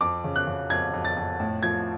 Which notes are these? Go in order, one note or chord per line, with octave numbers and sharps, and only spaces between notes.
F2 D6
C#3
F#6
C#3
F2 G#6
F2
A6
F2
A2
F3 G#6